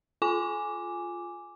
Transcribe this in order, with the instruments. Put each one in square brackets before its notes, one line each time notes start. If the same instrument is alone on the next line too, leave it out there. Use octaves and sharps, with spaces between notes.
[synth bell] F4 G#5 D6